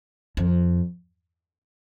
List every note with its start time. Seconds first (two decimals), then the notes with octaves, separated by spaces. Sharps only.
0.37 F2